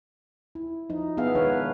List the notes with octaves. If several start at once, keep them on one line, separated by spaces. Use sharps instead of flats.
E4
F3 D#4
B3 G#4 E5 F5
D#3 G#3 D4 B4 C#5